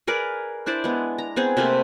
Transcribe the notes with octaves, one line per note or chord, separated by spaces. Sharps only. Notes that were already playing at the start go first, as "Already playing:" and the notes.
G#4 A#4 B4 D5
D4 E4 C5 D5
G#3 B3
A#5
B3 C4 G#4
C3 A3 A#3 B4